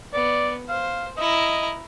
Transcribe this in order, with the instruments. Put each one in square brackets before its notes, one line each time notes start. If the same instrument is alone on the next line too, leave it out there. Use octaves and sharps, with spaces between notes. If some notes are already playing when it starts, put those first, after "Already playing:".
[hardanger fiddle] B3 [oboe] D5
[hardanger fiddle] C5 [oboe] F5
[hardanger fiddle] E4 A#5 [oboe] D#5